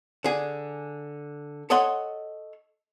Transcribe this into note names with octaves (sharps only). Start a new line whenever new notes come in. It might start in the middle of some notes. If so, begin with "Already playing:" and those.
D3 G#4
A4 C#5 D#5 F#5 C6